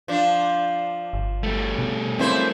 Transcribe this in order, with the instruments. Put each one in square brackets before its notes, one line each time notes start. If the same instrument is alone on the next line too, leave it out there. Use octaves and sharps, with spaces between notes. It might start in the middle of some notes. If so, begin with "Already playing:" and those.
[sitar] F3 D4
[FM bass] G1
[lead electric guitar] G3 A3
[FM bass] B2
[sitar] F#2 E4 C5 [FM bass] C4